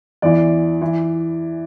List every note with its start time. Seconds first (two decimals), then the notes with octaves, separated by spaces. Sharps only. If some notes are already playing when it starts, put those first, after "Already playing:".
0.22 E2 E3 D5
0.82 E3